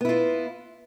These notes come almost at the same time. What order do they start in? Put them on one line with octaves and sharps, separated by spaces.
B3 E4 F4